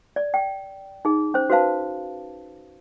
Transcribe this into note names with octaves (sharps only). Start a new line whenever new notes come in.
D5
G5
D#4 G#4
C#4 C5
F#4 B4 C5 F5 A5